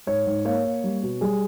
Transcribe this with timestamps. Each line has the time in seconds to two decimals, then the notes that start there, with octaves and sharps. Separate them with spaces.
0.07 G#2 C#5
0.26 G#2
0.45 A#3 C#5
0.64 A#3
0.84 G3
1.03 B2
1.21 G3 G#4